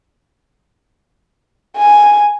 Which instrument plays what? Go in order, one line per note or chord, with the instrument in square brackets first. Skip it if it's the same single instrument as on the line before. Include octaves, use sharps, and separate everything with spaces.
[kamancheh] G#5